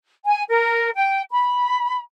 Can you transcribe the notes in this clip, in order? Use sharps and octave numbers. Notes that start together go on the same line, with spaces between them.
G#5
A#4
G5
B5